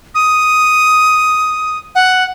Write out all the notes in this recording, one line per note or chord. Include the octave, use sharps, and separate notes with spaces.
D#6
F#5